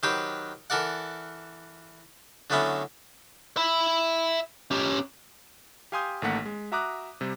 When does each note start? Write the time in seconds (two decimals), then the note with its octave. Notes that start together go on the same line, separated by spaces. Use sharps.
0.03 D#3 F#3 G4 B4 C5 G5
0.70 E3 A4 A#4 D5 F#5
2.50 D3 F#3 A3 B3 C#4 E4
3.57 E5 B5
4.71 C#4 G4
5.92 G4 F5 G#5 C6 D#6 G6
6.22 A1 D#3 A3 A#3 F#5 B6
6.46 G#3
6.72 F#4 E5 A#5 D6 D#6 F#6
7.21 C3 G3